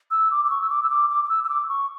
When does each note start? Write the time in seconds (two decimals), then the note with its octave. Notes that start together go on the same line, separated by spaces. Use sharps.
0.11 E6
0.31 D6
0.45 D6
0.50 C#6
0.61 E6
0.70 D6
0.83 E6
0.90 D6
1.10 D6
1.25 D6
1.29 E6
1.44 E6
1.49 D6
1.69 C#6